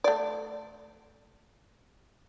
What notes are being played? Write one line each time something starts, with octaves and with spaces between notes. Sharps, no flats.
A3 D5